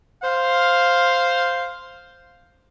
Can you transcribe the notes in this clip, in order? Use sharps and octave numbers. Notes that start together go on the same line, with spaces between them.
C5 F5